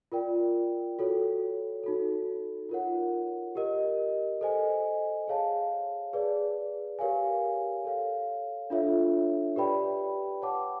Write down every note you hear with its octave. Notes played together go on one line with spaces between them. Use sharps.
F4 A#4 D5 G5
F#4 A4 C#5
D#4 F#4 A4
F4 A#4 C#5 F#5
G4 A#4 D#5
A4 C5 D#5 G#5
G#4 C#5 F5 A5
G#4 B4 D5
G4 A#4 C#5 F5 G#5
A4 C#5 F5
D4 F4 A4 C#5 E5
G4 B4 D5 G5 B5
C#5 F#5 A5 D6